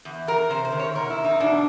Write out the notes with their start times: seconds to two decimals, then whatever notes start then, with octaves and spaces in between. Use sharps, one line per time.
0.05 E2
0.27 E2 A#4
0.50 C3 C5
0.65 C5
0.72 D#3
0.80 C#5
0.95 B2 A#4
1.10 E4
1.17 E2
1.24 D#4
1.40 B2 D4